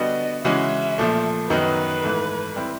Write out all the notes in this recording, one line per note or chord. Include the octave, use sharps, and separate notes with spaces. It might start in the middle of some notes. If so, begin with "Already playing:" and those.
Already playing: D3 G3 B3 D4 F#4 D#5
C#3 E3 G#3 C#4 F#4 E5
A#2 F3 A3
F#2 D#3 F#3 B3 D#4 B4
G#2 E3 A3
G3 C4 E4